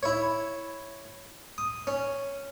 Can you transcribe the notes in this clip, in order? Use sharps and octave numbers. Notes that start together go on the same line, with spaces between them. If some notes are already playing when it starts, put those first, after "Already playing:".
E4 C#5
D#6
C#4